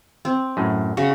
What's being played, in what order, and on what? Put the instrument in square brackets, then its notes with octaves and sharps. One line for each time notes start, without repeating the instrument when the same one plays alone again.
[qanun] C4
[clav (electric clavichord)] F#2 A2
[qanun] C#3 [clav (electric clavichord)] F#4